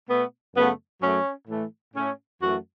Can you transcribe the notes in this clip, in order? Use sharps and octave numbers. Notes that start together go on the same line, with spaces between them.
B2 A3 B3
F#2 C#3 A3 B3
F#2 F#3 A3 C#4
A2 E3 A3
A2 A3 C#4
F#2 E3 A3 F#4